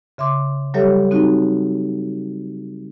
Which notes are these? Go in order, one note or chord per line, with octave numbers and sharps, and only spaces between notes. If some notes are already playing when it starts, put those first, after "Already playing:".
C#3 E5 C6 D6
F#3 G3 G4 A4 C#5 E5
C4 D#4 F#4